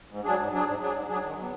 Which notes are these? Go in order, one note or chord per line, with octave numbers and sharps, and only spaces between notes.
G#2
F#3 D4 G#4
G#2
F#3 D4 G#4
G#2
F#3 D4 G#4
G#2
F#3 D4 G#4
D#3
F#3 B3